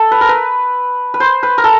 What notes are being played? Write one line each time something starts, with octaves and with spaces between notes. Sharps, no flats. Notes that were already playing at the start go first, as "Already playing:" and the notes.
Already playing: A4
B4
A#4
B4
B4
C5
B4
A#4
A4